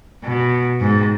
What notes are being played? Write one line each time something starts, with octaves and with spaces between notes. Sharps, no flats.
B2
G#2